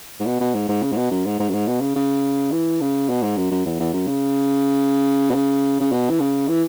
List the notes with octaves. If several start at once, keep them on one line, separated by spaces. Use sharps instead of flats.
G#2
B2
B2
G#2
G#2
C#3
G#2
B2
F#2
G#2
G#2
F#2
G#2
B2
C#3
C#3
E3
C#3
B2
G#2
F#2
F#2
E2
E2
F#2
C#3
B2
C#3
C#3
B2
E3
C#3
E3